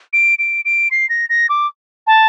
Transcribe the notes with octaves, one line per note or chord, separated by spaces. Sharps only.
D7
D7
D7
C7
A#6
A#6
D6
A5